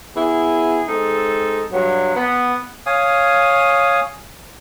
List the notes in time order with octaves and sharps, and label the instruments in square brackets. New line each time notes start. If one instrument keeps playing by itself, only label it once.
[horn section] B3 E4 G#4
G#3 C4 D#4 A4
G2 F#3
B3
[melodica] C#5 F5 G#5 D#6